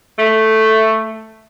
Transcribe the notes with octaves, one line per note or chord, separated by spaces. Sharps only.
A3